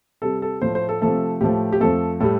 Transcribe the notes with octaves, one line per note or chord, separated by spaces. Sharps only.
C3 G3 A4
A4
A2 F3 A3 C5
C5
A4
C3 F3 A3 A4
A2 F3 A3 G4
G4
F2 F3 A3 A4
A2 G3 A4